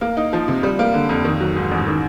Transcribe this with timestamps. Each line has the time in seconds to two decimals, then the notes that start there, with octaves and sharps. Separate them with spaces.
0.01 A#3
0.17 D#4
0.33 F3
0.48 C3
0.63 G3
0.79 A#3
0.94 D3
1.09 F2
1.24 D#3
1.40 F#3
1.56 G#2
1.71 A1
1.87 D#3